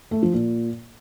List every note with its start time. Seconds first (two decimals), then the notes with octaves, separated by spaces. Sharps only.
0.11 A3
0.23 F3
0.34 A#2